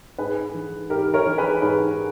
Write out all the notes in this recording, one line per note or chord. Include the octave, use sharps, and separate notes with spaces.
G#2 G#4 B4
E3
G#2 G4 A#4
A#4 C#5
E3
G#4 B4
G#2 G#4 B4